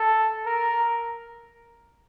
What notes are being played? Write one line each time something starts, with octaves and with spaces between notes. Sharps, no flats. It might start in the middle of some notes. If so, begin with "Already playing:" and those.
Already playing: A4
A#4